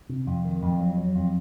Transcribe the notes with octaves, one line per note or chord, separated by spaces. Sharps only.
C3
F2
D#3
F2
F#3
F#3
F2